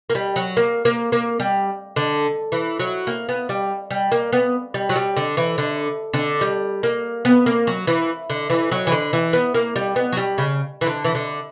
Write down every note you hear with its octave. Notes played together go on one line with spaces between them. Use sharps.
A#3
G3
F#3
A#3
A#3
A#3
G3
D3
E3
F#3
A#3
B3
G3
G3
A#3
B3
G3
F#3
G3
D3
E3
D3
D3
G3
A#3
B3
A#3
F#3
E3
D3
E3
F#3
E3
D3
E3
B3
A#3
G3
B3
F#3
G3
C#3
E3
D3
E3
D3